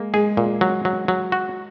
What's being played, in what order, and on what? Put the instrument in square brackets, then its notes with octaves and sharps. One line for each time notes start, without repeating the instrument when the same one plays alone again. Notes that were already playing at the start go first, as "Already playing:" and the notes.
Already playing: [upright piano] G#3 [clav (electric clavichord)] A#3
[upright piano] G#3 [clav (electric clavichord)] G#4
[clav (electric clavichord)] A#2
F#3
F#3
F#3
F#4